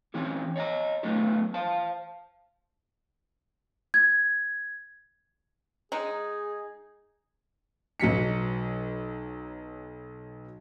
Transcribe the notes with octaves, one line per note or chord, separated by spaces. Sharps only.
E3 C4 C#4 D#4 G4
C#5 D#5 G#5 A#5
F#3 A3 B3 D4 G4
C5 F5 A5
G#6
G#3 D#4 G#4
B1 F#3 B6 C#7